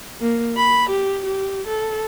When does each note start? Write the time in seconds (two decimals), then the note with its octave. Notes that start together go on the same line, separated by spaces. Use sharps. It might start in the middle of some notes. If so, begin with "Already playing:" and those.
0.20 A#3
0.57 B5
0.90 G4
1.25 G4
1.67 A4